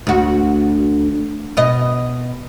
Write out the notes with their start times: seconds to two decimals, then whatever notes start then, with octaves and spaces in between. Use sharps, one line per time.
0.07 D2 F#4
1.57 B2 D#5